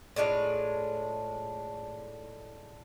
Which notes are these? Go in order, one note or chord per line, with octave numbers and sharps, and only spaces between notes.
A2 G#3 D4 F4